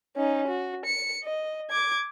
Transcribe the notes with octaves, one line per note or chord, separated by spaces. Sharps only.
C#4 D#4
F#4
C#7
D#5
D6 G#6